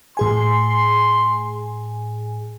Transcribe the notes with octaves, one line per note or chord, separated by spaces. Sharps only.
A2 G#4 G#5 C6